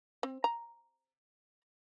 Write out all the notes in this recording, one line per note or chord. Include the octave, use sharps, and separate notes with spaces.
C4
A#5